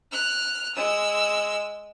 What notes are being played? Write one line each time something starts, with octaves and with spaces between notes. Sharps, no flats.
F6 F#6
G#3 E6